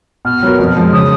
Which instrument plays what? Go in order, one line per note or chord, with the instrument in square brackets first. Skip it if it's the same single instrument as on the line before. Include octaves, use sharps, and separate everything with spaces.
[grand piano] B2 [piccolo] F6
[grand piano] F#3 B3 F#4 A#4
F2
F3 G#3
[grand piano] C#3 [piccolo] D#6